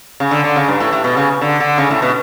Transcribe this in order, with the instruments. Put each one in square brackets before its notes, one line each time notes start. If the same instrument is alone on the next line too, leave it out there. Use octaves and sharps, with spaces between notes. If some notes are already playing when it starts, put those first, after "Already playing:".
[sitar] C#3
D3
D3
C#3
G2
A2
A2
B2
C#3
D3
D3
C#3
A2
B2